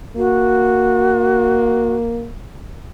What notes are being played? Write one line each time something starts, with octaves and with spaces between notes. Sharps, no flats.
A#3 F#4